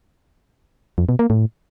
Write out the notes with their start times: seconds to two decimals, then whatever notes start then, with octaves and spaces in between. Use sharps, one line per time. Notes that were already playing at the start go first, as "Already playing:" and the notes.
0.98 F2
1.09 B2
1.19 A#3
1.30 A2